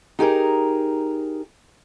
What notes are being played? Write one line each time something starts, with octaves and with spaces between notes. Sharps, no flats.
D#4 G4 G#4 A#4